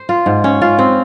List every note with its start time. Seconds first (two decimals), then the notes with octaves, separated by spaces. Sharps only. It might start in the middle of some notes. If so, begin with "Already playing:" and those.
Already playing: C5
0.09 F4
0.26 G#2
0.44 C#4
0.62 F4
0.79 C4